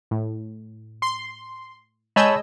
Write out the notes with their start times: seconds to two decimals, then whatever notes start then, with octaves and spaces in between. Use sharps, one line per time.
0.11 A2
1.02 C6
2.16 G#3 C#5 D#5 G#5 A5 B5 E6 G6